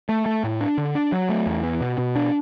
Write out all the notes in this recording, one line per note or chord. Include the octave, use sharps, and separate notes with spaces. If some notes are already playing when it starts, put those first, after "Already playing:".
A3
A3
A2
D4
D3
D4
F#3
A3
E2
B3
B2
B2
D4